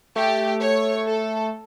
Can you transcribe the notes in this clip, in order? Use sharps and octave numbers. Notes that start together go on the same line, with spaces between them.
A3 G4
C#5
A4